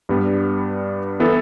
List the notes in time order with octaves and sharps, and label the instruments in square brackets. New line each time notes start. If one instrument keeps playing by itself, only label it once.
[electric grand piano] G2 G3 B3
E3 B3 E4 A4